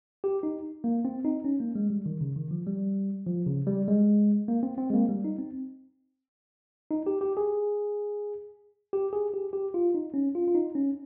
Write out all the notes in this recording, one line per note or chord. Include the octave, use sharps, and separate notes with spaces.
G4
D#4
A#3
C4
D#4
C#4
A#3
G#3
G3
D#3
C#3
D#3
F3
G3
F3
C#3
G3
G#3
A#3
C4
C4
G#3
A#3
G3
D#4
C4
D#4
G4
G4
G#4
G4
G#4
G4
G4
F4
D#4
C#4
F4
F4
D#4
C#4